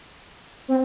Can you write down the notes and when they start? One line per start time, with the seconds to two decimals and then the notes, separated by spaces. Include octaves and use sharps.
0.68 C4